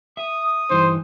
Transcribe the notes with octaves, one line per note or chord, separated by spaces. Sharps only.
E5 D#6
G2 E3 D#4 C5